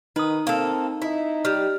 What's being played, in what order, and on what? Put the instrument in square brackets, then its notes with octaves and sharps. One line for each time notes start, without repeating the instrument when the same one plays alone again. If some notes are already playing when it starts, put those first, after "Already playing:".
[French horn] D#3 [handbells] D#4 D#6 [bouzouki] B4
[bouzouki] A#3 A4 [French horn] C4
[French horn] D#4 [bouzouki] E4
[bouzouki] G3 [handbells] F6